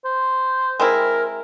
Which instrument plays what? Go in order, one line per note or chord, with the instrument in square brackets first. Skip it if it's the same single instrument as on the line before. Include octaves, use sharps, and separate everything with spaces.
[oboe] C5
[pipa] G#3 C4 E4 [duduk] A#4